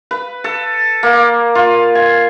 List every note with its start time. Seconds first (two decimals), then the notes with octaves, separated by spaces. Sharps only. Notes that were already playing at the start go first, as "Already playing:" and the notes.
0.11 B4
0.44 A4
1.03 A#3
1.55 F4
1.95 G#5